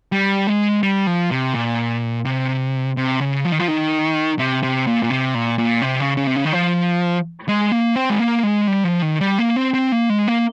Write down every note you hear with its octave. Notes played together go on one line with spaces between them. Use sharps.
G3
G#3
G3
F3
C3
A#2
C3
C3
C#3
F3
D#3
F3
D#3
C3
C3
A#2
A#2
C3
A#2
A#2
C3
C#3
C#3
C3
C#3
D#3
F3
G#3
A#3
C4
G#3
A#3
G#3
G3
F3
D#3
G3
A#3
C4
C4
A#3
G#3
A#3